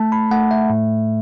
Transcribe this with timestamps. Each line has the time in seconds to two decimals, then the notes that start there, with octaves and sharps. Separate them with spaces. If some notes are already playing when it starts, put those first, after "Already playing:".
Already playing: A3 A5
0.12 B5
0.31 A3 F#5
0.51 E5
0.70 A2